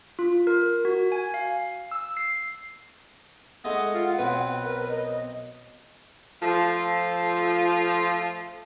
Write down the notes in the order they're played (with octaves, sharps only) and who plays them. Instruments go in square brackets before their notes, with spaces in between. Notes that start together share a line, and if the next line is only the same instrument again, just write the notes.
[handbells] F4
A#4
F#4
G#5
F5
E6
C7
[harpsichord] G#3 A3 D#4 [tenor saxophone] D#5 [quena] F#5
[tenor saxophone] F4
[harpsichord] B1 C4 [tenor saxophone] B4
[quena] A#4
D#5
[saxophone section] F3 A3 F4